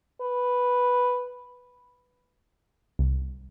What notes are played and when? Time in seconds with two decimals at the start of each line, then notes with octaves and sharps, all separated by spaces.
0.22 B4
2.99 C2